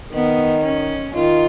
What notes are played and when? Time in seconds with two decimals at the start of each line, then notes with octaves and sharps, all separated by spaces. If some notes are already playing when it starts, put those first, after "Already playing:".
0.13 D#3 B3
0.64 C#4
1.15 D#3 F4